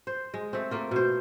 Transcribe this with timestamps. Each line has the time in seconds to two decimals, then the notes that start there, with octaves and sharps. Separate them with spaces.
0.07 C5
0.34 G#3
0.53 A3 C4
0.71 A3 A#3 F4
0.91 B2 C5